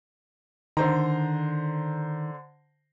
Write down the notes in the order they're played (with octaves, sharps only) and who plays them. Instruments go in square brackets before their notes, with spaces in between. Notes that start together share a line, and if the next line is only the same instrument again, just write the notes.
[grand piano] D3 C5 A#5 [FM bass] D#3